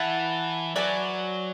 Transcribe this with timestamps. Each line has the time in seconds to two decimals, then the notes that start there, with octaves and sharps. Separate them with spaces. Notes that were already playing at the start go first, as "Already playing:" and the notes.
Already playing: E3 E4 B4 F#5 A5
0.76 F#3 F#4 B4 D5 G#5